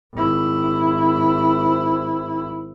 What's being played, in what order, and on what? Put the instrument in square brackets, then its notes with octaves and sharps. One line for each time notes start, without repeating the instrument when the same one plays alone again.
[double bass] G#1 E4